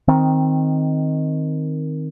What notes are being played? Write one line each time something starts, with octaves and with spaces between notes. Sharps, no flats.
D#3 C4